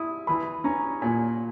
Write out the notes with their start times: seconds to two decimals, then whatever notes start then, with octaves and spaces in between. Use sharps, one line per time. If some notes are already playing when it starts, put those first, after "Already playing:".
Already playing: E4 D#6
0.27 E3 B5
0.64 C#4 A#5
1.02 A#2 G#5